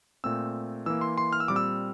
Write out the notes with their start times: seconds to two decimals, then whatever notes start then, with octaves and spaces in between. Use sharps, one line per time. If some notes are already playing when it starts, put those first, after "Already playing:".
0.24 A#2 A3 C4 E6
0.86 E3 A#3 E6
1.01 C6
1.18 C6
1.33 F6
1.40 E6
1.48 A#2 G3 C4 D6
1.56 E6